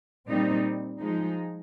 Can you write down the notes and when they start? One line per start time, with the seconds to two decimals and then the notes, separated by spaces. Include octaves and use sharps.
0.28 A#2 G3 C4 D#4
1.01 F3 G#3 D#4